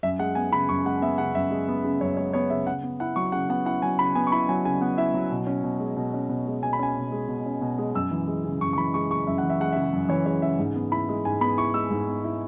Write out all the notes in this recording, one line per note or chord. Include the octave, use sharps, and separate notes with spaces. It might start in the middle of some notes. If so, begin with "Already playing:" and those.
F#2 E5
G#3 F#5
B3 G#5
C#3 B5
F#2 C#6
G#3 F#5
B3 E5
C#3 F#5
F#2 E5
G#3
B3
C#3
F#2 C#5
G#3 C#5
B3 C#5
C#3 E5
C#3 F#5
B3
E4 F#5
F#3 C#6
C#3 F#5
B3 F#5
E4 F#5
F#3 G#5
C#3 B5
B3 G#5
C#6
E4 B5
F#3 G#5
C#3 G#5
B3 F#5
E4 E5
F#3
B2
C#4
B2
G#3
B2
C#4
B2
G#3
B2 G#5
B5
C#4 G#5
B2
G#3
B2
C#4
B2
G#3
F#2 E6
E3
G#3
C#3
F#2 C#6
C#6
E3 B5
G#3 C#6
C#3 C#6
F#2 E5
F#5
E3
E5
G#3 F#5
E5
C#3
F#2
E3 C#5
G#3 C#5
C#3 E5
G#2
B3
E4 B5
G#3
G#2 G#5
B3 B5
E4 C#6
G#3 E6
G#2
B3
E4